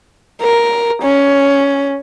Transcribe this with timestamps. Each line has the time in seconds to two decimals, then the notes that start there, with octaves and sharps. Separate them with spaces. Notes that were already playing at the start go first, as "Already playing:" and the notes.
0.42 A#4
1.03 C#4